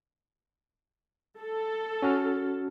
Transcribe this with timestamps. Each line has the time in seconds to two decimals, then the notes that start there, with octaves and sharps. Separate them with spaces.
1.40 A4
2.02 C#4 F#4 F6